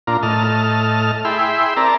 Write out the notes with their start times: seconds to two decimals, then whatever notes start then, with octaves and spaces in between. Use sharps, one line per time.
0.07 A#2 D4 F4 A#5
0.23 A2 D#5 A5 F6
1.25 E4 G#4 E5 G5 B5 C6
1.77 C4 A#4 D5 A5 A#5